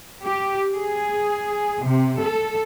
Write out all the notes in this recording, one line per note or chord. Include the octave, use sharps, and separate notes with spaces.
G4
G#4
C3
A4